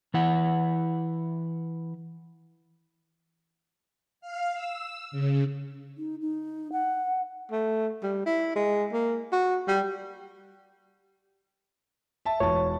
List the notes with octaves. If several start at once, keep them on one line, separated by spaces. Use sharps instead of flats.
E3 E4 F#5
F5
E6
C#3
D#4
D#4
F#5
A3
G3
E4
G#3
A#3
F#4
G3
E5 A5
E1 C#5 A5